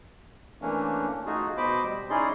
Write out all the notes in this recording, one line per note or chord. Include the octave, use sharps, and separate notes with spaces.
E3 A3 A#3 C#4 D4
A3 D#4 F4 F#4 G#4
B2 C5 D#5 B5 D6
G3
C#4 D#4 E4 G#4 D5 C6